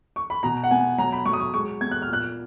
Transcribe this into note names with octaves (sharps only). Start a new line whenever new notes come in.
C#6
B5
B2 A#5
F#5
B3 G#5
F#3 A#5
B5
F#3 C#6
D#6
C#6
G#3 C#6
B3 G#6
F#6
F6
A#2 F#6